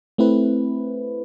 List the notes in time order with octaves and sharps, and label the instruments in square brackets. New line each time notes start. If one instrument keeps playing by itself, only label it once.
[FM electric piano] A3 C4 E4 B4